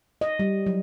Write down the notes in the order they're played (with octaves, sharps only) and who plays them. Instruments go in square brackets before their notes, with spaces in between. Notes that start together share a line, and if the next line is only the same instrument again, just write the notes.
[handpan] D#5
G3
F#3